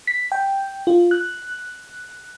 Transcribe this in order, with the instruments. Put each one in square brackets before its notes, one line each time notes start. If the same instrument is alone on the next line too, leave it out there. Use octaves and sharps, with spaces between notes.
[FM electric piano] B6
G5
F4
F#6